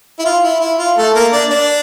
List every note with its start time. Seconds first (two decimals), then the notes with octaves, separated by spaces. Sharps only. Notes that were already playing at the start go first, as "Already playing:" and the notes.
0.19 E4
0.25 F4
0.43 E4
0.61 E4
0.78 F4
0.97 A3 A4
1.14 A#3 A#4
1.32 D4 D5
1.50 D4 D5